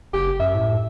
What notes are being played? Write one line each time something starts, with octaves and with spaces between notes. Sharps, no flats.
F#1 G4
F#2 E5
A2